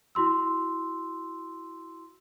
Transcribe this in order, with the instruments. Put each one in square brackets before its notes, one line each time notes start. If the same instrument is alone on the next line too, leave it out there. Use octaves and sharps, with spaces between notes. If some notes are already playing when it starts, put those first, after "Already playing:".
[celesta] E4 F#4 C6 E6